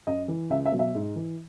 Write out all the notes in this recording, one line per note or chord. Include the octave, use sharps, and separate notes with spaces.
F#2 D#5
E3
C#2 E5
E5
B2 F#3
E5
G#2
E3